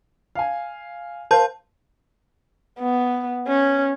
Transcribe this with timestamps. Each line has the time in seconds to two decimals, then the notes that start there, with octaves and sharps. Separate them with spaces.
0.35 F5 G#5
1.31 A#4 C5 F5 A5 G6
2.79 B3
3.47 C#4